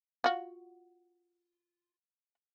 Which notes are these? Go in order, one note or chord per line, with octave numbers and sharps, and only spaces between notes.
F4 F#4